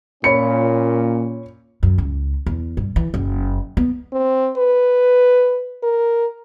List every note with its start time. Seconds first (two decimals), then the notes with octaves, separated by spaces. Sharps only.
0.24 A#2 C#4 C#5 B5 C#7
1.83 F#2
1.98 C#2
2.46 E2
2.77 G2
2.96 E3
3.14 F#1
3.77 B3
4.12 C4
4.57 B4
5.83 A#4